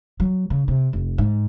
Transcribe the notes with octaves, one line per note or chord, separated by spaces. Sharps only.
F#3
C#3
C3
F1
G#2